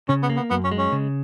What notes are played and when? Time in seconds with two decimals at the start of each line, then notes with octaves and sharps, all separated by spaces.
0.09 C#3 C#4
0.22 B3
0.30 A#3
0.36 B3
0.50 F#2 B3
0.64 C#4
0.71 G#3
0.78 C#4
0.92 C#3